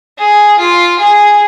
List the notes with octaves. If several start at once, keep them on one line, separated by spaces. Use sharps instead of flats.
G#4
F4
G#4